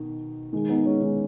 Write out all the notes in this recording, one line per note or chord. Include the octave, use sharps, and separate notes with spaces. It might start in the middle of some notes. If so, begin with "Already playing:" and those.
Already playing: B2 D#3
D#3 G#3
B3 D#4
G#3 C#4
D#3 G#3